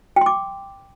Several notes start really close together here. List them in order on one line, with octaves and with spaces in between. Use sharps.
G5 C6 D6